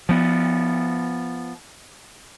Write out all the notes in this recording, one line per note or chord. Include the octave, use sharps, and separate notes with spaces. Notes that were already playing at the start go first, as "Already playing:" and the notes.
F3 B3